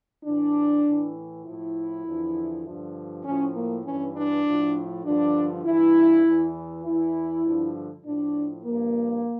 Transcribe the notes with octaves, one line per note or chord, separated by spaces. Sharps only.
A2 E3 D4
A2 E3
A2 F3 E4
E2 D3 F3
G2 D3 F3
A2 F3 C#4
A#3
G2 E3 C#4
D4
A2 F3
G2 D3 F3 D4
G2 E3 E4
E2 E3
E2 E3 E4
G2 D3 F3
A2 F3 D4
G2 D3 F3 A#3